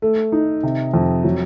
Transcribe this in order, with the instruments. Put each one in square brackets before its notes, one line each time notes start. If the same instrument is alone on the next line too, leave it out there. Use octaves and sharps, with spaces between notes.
[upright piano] A3
D#4
C3
F2
F#3